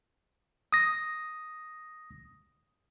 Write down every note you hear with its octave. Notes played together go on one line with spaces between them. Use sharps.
D#6 A#6